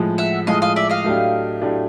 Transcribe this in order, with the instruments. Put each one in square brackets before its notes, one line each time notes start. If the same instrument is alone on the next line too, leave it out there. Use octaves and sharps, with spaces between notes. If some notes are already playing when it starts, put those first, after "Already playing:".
Already playing: [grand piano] A2 F3 G#3
[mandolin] E5 F#5
[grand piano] A2 F3 G#3 [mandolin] D#5 F5
[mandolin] D#5 F5
D5 E5
D#5 F5
[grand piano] A2 F#3 A3 D4 G4
A2 F#3 A3 D4 G4